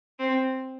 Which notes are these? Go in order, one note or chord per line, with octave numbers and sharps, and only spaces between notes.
C4